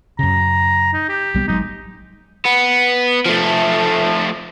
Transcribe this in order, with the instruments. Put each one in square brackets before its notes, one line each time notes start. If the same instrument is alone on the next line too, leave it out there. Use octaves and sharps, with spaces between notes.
[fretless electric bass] F#2 C#3 [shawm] A#5
[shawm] D#4
G4
[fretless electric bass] B1 G3 B3
[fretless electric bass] G#1 F#3 G#3 [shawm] D#4
[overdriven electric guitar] B3
F3 A3